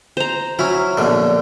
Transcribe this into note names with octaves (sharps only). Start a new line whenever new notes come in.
C5 A#5
F#3 C#4 E4
A#1 B2 D3